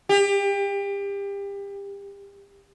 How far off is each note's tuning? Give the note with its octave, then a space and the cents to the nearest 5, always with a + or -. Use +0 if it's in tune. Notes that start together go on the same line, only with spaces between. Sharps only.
G4 +30